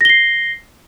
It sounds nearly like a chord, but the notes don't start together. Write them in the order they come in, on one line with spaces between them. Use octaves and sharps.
A#6 G7 C7